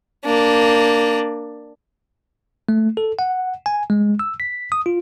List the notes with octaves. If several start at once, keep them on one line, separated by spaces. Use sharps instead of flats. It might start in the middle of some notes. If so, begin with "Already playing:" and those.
A#3 D4
A3
A4
F#5
G#5
G#3
E6
B6
D#6
F4